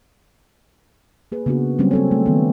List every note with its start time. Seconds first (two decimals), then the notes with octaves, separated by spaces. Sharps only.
1.32 A#3 G#4 B4
1.46 C#3 A#3 B3 D4 F#4
1.79 F#3 G3 A#3 C4 C#4
1.91 C4 A4 C#5
2.11 A3
2.26 D#3 B3